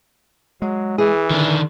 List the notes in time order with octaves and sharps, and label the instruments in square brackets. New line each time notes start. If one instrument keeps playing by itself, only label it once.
[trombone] F#3 [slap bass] G#3
[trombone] E3 [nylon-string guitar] G#4
[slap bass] D3 [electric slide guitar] D#3 D4